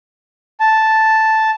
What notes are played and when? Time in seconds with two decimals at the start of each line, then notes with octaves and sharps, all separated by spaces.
0.60 A5